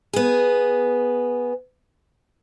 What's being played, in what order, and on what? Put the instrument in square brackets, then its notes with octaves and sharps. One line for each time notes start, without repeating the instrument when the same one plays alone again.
[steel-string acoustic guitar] B3 G#4